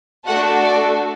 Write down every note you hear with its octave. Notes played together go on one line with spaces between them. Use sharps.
A3 D4 F#4 A4 F#5
D5